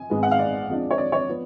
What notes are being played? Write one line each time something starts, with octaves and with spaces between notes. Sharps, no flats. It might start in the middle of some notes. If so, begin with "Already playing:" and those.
Already playing: G#5
G#1 G#2 G#3 B3
F#5
F5
D5
F2 F3 G#3 D4
C#5
D5
C#5
F3 B3